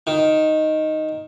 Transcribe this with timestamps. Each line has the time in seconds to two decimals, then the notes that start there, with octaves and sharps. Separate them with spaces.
0.07 D#3